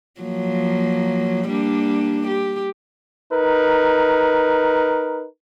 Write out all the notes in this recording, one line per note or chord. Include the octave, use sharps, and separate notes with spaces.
F3 F#3 A#3
G3 A#3 D4
G4
D#4 A#4 B4